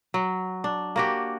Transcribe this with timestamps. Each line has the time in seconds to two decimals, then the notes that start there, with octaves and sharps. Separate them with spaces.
0.14 F#3
0.64 D4
0.96 A#3 F#4 G4